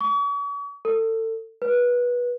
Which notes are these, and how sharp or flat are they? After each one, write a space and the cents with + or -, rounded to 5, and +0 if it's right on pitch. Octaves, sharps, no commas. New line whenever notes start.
C#6 +40
A4 +30
B4 -20